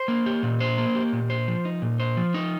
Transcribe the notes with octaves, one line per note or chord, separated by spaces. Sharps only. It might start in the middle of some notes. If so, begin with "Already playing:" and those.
Already playing: C5
A#3
G4
A#2
C5
A#3
G4
A#2
C5
F3
D#4
A#2
C5
F3
D#4